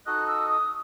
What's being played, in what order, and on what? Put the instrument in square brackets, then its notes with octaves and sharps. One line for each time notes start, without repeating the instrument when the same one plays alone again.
[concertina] D#4 F#4 A4 D#5 [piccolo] F#6
[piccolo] E6
D#6